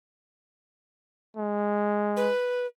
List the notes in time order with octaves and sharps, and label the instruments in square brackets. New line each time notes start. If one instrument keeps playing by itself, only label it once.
[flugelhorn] G#3
[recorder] B4